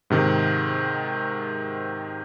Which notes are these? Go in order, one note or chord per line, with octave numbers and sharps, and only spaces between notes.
G#2 C3 D#3